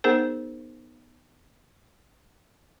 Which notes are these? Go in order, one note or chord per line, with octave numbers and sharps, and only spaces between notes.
B3 D#4 G#4 A#4 C5